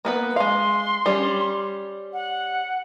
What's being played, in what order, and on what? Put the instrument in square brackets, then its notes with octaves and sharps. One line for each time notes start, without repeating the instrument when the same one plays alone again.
[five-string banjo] A#3 B3 B4
[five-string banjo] G#3 F5 [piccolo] C6
[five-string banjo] G3 C#4
[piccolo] F#5